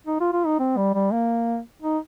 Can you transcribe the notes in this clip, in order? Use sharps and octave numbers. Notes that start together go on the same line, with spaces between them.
D#4
F4
F4
D#4
C4
G3
G3
A#3
D#4